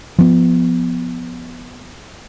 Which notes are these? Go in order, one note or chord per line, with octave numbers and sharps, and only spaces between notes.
F3 B3